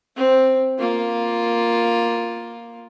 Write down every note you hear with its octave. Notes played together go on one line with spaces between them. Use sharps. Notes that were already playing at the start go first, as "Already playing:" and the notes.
C4
A#3 F4